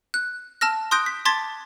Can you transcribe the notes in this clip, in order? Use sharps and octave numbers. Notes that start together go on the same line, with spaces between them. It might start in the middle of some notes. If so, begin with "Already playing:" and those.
F#6
A5 E6 F6 A#6
C6 D#6 F#6 G6 A#6 D7
B6
A5 C6 D6 G#6 A6 B6